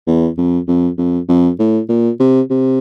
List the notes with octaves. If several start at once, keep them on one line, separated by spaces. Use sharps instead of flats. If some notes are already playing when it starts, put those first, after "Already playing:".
E2
F2
F2
F2
F2
A2
A#2
C3
C3